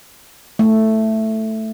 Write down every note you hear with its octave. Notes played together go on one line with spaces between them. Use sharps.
A3